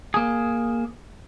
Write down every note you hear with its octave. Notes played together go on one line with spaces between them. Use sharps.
A#3 G#4